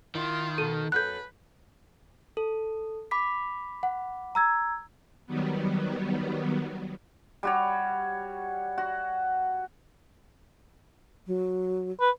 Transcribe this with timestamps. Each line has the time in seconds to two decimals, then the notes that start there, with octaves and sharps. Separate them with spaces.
0.15 D#3 E4 F4 E5
0.58 B2 A4 D#7
0.92 F#2 F#4 A4 B4 F#6 G6
2.37 A4
3.11 B5 D6 B6
3.83 F#5
4.35 A#5 E6 G#6
5.26 D#3 F#3 G3 B3
7.43 G3 F#4 C#5
8.78 F#4
11.27 F#3
12.01 B4